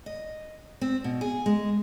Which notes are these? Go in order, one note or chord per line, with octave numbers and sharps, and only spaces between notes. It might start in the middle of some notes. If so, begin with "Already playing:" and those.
D#5
C4
B2
G#4
G#3